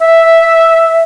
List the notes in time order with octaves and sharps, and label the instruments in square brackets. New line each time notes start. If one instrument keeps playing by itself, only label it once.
[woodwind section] E5